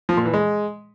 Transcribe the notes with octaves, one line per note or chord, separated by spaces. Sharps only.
F3
A#2
E3
G#3